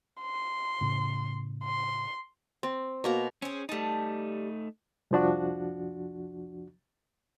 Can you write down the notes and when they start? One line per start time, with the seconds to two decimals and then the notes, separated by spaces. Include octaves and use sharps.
0.21 C6
0.81 A2 C#3
1.64 C6
2.63 C4
3.04 B2 A#3 A#5
3.42 C4 C#4 G#4
3.69 G3 A3 D#4 A5
5.11 C2 F2 F3 D4 F#4